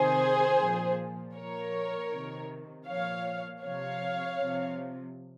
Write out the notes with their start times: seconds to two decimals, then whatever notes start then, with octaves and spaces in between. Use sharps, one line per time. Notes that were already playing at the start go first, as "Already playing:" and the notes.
Already playing: C3 D#3 G#4 C5
0.60 A#2 F3
1.35 A#2 F3 A#4 C#5
2.12 C3 D#3
2.87 A#2 F3 C#5 F5
3.62 C3 F3 C#5 F5
4.39 C3 F3